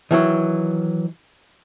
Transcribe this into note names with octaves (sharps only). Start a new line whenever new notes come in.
D#3 E3 F#3